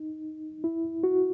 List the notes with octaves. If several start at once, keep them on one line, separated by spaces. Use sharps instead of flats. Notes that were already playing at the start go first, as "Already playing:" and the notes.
Already playing: D#4
E4
F#4